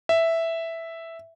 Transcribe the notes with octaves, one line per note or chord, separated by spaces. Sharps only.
E5